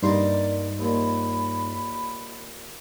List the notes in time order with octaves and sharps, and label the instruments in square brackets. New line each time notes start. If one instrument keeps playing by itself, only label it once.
[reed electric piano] G2 D#4 C6 [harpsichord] G3 A#3 A#4 [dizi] D5
[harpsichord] D#2 A#2 [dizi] B5